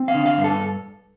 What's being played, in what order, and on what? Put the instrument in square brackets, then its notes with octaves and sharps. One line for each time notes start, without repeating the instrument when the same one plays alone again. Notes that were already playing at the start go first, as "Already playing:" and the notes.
Already playing: [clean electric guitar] C4
F5
D3
F5
G2
A4